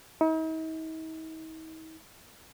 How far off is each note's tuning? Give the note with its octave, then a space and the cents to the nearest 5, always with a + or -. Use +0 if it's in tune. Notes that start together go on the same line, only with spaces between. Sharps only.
D#4 +45